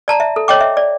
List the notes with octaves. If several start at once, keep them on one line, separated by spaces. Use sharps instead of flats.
D5 A5 A#5
E5
A4
C#5 D#5 G5 D6
E5
D5